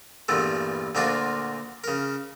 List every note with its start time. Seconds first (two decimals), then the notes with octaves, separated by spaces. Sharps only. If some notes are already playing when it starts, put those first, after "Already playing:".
0.28 E2 G2 A#2 E3 A3
0.95 D2 A#2 A#3 D4 F4 F#4
1.84 C#3 A#4